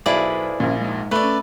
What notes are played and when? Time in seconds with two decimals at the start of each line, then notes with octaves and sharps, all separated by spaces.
0.06 B1 E4 G#4 A4 B4 C5 D5
0.60 A#1 A#2 C#4
0.80 G#3 D#4
1.11 A3 B4 D5
1.23 C#4